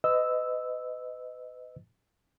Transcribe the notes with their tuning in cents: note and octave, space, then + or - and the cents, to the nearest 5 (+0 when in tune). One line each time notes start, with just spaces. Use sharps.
B4 +35 D#5 +0 E6 -5